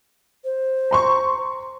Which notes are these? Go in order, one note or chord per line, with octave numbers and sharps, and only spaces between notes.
C5
A#5 C6 C#6